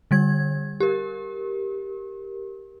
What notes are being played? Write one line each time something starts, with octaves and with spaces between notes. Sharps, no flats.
D3 G3 G#6
G4 A#4